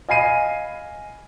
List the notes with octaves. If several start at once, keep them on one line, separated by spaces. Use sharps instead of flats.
D#5 F5 G#5 B5 C7 D#7